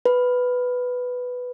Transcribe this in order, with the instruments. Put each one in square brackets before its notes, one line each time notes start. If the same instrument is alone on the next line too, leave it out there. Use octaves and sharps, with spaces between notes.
[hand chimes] B4